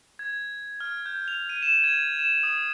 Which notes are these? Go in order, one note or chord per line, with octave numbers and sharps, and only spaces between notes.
G#6
F6
G6
F7
D#7
E7
G#6
E7
D#6